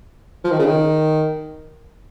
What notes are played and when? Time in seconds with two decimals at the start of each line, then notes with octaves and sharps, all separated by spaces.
0.44 F3
0.51 D#3
0.59 C#3
0.66 D#3